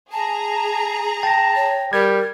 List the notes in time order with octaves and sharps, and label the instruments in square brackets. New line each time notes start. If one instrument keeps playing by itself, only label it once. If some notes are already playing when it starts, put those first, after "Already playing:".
[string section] G#4 A#5 [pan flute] A5
[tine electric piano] G5 A#6 [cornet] A5
[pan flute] C#5
[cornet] G3 [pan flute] A#4 [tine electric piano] G#6